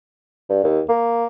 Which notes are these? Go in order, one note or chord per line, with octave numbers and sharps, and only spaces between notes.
G2
D#2
A#3